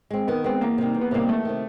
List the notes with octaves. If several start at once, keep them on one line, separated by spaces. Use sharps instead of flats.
G#3 C4
D#3 B3
G#3 B3 C4
E2 A#3
C3 D#3 G3
E2
B3
C3 D#3 G3 A#3
E2 A3
C3 D#3